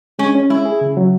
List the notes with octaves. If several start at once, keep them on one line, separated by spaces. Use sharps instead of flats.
G#3 C#4
C#4
G#3 E4
G#4
C#3
F#3